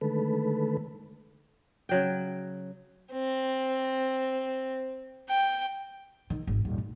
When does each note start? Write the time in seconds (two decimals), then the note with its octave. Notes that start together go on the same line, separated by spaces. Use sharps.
0.01 D3 D#3 G#3 A3 A4 B4
1.89 C#3 F#3 G5
3.12 C4
5.29 G5
6.30 D#3
6.47 G#1
6.65 D#1
6.78 D2